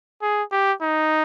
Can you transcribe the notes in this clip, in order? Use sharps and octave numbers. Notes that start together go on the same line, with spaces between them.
G#4
G4
D#4